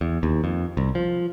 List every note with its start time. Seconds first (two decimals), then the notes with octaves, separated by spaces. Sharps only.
0.01 E2
0.23 D#2
0.44 F2
0.77 C2
0.95 F3